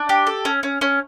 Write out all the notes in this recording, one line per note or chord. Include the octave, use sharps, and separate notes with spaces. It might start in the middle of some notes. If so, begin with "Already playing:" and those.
Already playing: D4
G4
A4
C#4
C#4
C#4